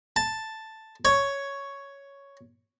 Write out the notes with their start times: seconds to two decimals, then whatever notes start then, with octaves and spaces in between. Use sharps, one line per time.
0.16 A5
1.05 C#5